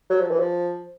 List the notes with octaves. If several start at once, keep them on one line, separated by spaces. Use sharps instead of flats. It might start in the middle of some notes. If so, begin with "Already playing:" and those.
F#3
F3
E3
F3